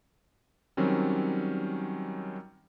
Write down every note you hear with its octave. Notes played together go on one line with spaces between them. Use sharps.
D#3 F#3 G3 C4 C#4